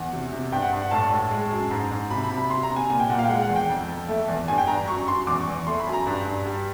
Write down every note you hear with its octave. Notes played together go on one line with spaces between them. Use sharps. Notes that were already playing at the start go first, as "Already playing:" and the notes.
Already playing: E2 F#5
C3
C3
G2 G5
F#5
G2
F#5
A2 A5
A2
G#3
F#2
G#2
G#2
C3 B5
B5
C3
B5
C3 C6
A#5
C3
G#5
A#2 G#5
G5
A#2 F#5
F5
G5
G#3 F#5
F#5
E2
G5
F2
F2
A3
E2
G2 G#5
G5
G2 A#5
A#5
F#2 C#6
F#2 C6
E2 D6
C#6
E2
C#6
A3 C6
B5
F#2
A#5
G2
G2
G3